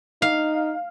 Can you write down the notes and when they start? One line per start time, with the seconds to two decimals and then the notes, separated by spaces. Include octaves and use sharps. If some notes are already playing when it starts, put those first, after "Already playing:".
0.22 D#4 F5